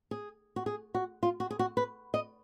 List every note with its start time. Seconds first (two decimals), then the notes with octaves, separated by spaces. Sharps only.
0.11 G#4
0.56 F#4
0.66 G#4
0.95 F#4
1.23 F4
1.40 F#4
1.51 G#4
1.59 F#4
1.77 B4
2.14 D#5